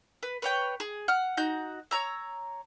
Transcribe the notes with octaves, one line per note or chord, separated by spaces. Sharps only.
B4
B4 C#5 G5
G#4
F#5 F6
D#4 F#4 G6
C#5 A#5 E6